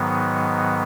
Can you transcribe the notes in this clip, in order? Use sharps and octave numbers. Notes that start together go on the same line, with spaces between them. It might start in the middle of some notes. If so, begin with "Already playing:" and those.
Already playing: G#2 D#3 F#3 B3